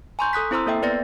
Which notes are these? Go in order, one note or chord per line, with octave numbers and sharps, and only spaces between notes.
G#5 A#5 C6 C#6 G6
A4 D#6 F#6 B6
C4 E4 C5 A#5 C6 E6
A#3 A4 E5 G5
B3 B4 D5 A6 A#6